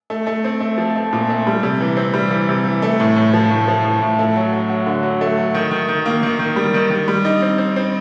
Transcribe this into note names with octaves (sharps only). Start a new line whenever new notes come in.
A3
A3
C4
A3
F3
A3
A#2
A3
G3
C3
E3
C4
G3
E3
C3
E3
A3
A2
A2
F3
A2
F3
A2
A2
A3
F#3
F#3
F#3
D3
F#3
A3
F#3
D#3
D#3
D#3
A#3
D#3
D#3
G3
D#3
D#3
G3
D#4
C4
C4
C4